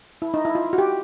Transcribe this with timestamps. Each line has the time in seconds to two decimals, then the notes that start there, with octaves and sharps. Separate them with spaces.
0.22 E4
0.34 D#4
0.45 E4
0.55 F4
0.73 F#4
0.78 G4